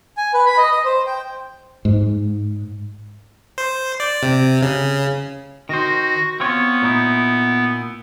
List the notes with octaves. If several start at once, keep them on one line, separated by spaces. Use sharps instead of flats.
G#5
B4
B5
D#5
D#5
C5
G5
G#2
C5
D5
C3
C#3
D#3 F#4 C5 A#6
B3 C4 F4 C#5
A#2 D#4 E4